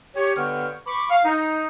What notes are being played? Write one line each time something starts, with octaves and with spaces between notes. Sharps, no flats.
G4 C#5
G2 D3 B3 C#5 G5 F6
B5 C#6 D6
F5
D#4